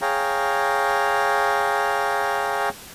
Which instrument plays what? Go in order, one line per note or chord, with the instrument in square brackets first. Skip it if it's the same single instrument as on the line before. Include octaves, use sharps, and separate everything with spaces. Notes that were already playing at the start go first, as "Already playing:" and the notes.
[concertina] G#4 C#5 F5 G5 A#5